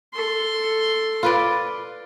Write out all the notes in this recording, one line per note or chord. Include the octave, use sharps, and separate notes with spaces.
A4 C6
F4 B4 D5